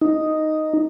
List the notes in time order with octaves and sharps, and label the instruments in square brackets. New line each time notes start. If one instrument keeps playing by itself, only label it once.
[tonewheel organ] D#4